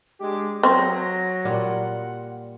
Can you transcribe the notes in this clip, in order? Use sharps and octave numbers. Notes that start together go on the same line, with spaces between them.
G#3 D4 G4 D6
F#3 C4 A#6
A#2 G3 F4 F#5